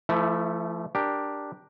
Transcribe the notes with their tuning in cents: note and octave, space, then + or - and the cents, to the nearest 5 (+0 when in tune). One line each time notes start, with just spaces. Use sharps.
F3 -45 A3 +0 E4 -10
D4 +0 G4 +0 A#4 +0